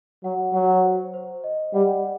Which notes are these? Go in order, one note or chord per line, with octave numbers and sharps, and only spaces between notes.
F#3 F#5
F#3 F#5
C5
C5
D#5
G3 F#5